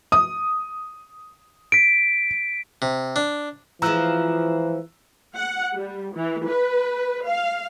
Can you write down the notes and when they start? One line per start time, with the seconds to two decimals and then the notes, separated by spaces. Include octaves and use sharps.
0.12 D#6
1.72 B6 D7
2.82 C3
3.16 D4
3.82 E3 F3 G#3 A#5 E6 F#6
5.36 F#5
5.76 G3
6.16 E3
6.47 B4
7.27 F5